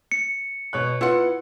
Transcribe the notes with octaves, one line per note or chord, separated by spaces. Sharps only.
C#7
B2 C#5 F#6
B3 E4 F4 F#5